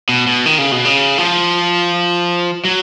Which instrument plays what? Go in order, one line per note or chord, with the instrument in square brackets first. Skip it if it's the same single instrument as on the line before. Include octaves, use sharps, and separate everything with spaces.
[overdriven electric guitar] B2
B2
D#3
C#3
B2
C#3
F3
F#3